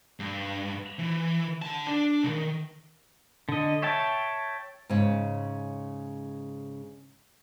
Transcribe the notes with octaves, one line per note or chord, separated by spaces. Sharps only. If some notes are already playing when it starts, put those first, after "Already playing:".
G2
E3
D3 A5
D4
C2 D#3
D3 D#5
C#5 E5 G5 A5
G#2 C#3